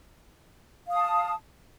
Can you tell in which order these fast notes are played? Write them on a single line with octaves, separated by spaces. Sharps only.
F5 D#6 A5